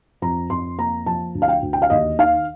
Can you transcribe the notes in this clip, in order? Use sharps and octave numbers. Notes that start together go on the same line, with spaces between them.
F2 A#5
F2 C6
A#3 A#5
F3 A5
D2
F5
G5
D2
G5
F5
D#2 D#5
D#3 F5